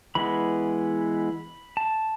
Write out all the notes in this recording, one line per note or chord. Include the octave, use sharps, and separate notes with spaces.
E3 G#3 B3 B5
A5